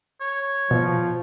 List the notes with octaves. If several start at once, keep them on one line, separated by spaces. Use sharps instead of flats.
C#5
B2 F3